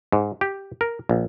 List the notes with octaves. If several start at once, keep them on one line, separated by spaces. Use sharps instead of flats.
G#2
G4
A#4
A#1